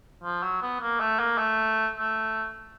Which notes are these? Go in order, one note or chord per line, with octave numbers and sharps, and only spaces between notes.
F3
F#3
B3
A#3
A3
A#3
A3
A3